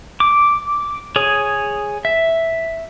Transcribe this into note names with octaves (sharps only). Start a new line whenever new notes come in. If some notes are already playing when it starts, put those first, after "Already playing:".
D6
G#4 C#5 D#6
E5